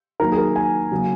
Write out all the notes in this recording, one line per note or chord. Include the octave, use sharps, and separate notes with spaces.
D#3 F#3 A#3 A#4
G#4
A#4
G#5
C#3 F#3 A#3 C#4